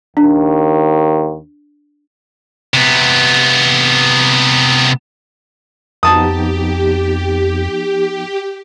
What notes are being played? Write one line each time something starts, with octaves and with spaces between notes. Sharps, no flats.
D#2 D4
C3 B3
F2 F3 B3 D#4 G4 A5 D#6